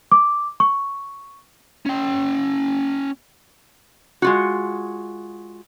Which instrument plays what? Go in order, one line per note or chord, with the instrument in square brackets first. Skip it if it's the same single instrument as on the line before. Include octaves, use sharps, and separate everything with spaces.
[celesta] D6
C#6
[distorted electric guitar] C#4 G5
[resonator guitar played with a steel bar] G#3 F4 F#4